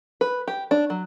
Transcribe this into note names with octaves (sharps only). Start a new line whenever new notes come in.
B4
G4
D4
F#3